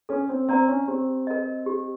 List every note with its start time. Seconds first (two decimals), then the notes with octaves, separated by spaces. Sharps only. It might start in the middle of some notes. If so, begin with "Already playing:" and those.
0.09 C#4 A4
0.29 C4
0.49 C4 D5 F5 A#5
0.68 C#4
0.88 C4 G4
1.27 A#4 D#5
1.66 G4